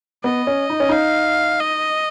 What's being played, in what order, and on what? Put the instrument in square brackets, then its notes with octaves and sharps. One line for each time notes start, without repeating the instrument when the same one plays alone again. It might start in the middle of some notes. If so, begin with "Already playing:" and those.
[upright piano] B3 [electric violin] D#5
[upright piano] C#4
D#4
C#4
[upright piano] D#4 [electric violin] F5
[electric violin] D#5